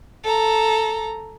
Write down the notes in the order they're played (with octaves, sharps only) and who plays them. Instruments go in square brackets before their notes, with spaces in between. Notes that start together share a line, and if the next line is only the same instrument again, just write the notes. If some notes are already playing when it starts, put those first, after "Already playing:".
[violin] A4 A#5